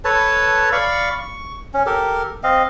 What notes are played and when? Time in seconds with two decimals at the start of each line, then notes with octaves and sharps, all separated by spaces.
0.05 A4 B4 C#5 A5
0.72 D5 F5 B5 C#6
1.18 C#6
1.74 C#4
1.86 G4 A4 A#4
2.43 C4 D#5 F5